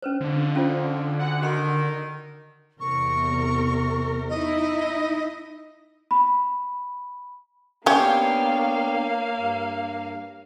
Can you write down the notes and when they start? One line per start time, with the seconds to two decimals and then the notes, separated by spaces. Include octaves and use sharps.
0.02 C#4 B4 C5
0.21 F2 D3
0.55 C#4 F4 C5
1.19 D2 F#5
1.42 D#3 F#4 B5 C6
2.80 E2 C3 A#4 C#6
4.29 D#4 E4 D#5
6.11 B5
7.86 A#3 B3 C#4 D4 G4 C#5 F5 G5
9.38 G2